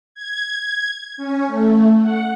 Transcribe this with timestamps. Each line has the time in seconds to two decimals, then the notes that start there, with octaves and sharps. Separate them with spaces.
0.15 G#6
1.17 C#4
1.47 A3
2.02 F#5